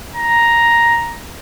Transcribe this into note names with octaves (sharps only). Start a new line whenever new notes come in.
A#5